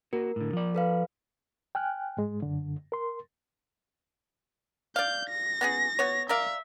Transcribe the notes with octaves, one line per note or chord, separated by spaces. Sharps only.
A#3 F#4 A#4
A2 D3
F3 D5
A4 B4 F5
G5 G#5 F6 F#6
G#2 G#3
F#2 D3
A#4 C6
D5 F5 G6
A#6
B3 C#4 G#4
B3 C#5
A#4 D5 E5 F5